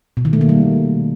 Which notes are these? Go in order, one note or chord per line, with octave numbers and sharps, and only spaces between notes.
B2
D#3
A3
A#3
G3